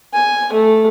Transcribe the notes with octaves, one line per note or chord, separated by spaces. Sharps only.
G#5
A3